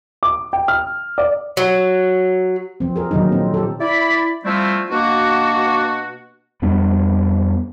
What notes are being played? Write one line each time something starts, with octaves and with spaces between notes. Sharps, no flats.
D6
G5
F6
D5
F#3
F3 C4
G#4 A#4
A#2 D3 D#3 F#3 D#4
C4
G4 A4
E4 D5 B5
F3 G3 A3 C4 E4 F4
B2 A#3 D4 F#4
F2 G3 B3 D4